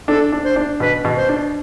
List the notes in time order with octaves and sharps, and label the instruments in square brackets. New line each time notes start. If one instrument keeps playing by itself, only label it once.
[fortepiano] D4 [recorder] A4
[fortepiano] D4
[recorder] C5
[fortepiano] D4
[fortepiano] B2 [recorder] B4
[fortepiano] B2
[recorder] C5
[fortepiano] D4